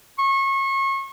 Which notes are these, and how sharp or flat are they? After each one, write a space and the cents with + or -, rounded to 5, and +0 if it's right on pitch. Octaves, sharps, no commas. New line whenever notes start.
C#6 -30